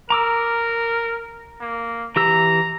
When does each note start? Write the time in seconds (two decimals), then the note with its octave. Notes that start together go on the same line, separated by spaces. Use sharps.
0.10 A#4 A#5 D6 E6
1.61 A#3
2.16 E3 G4 A#5 E6